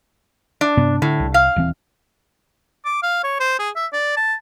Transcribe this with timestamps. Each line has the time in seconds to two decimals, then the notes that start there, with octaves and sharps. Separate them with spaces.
0.61 D4
0.77 G2 C3 B3
1.02 A2 D3
1.20 C2
1.34 F5
1.56 D#1 E3 C4
2.85 D6
3.03 F5
3.24 C#5
3.40 C5
3.59 G#4
3.76 E5
3.93 D5
4.17 A5